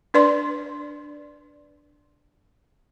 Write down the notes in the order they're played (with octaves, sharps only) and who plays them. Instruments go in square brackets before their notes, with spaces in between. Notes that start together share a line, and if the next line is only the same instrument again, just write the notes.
[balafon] D4 B4 D5 C6